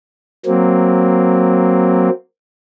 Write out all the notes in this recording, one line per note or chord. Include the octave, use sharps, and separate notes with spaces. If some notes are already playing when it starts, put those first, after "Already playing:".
F#3 A#3 C4